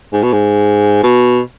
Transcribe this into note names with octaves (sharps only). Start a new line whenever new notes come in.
G#2
B2
G#2
B2